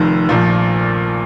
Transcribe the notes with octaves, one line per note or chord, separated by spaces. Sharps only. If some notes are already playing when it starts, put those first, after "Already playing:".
Already playing: F1 F2 D#3
A#1 A#2 F3